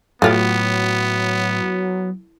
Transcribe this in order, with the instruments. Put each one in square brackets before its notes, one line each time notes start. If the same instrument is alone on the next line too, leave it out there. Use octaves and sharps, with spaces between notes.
[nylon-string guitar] A2 [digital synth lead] F#3 [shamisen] A3 F4 G4 [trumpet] B3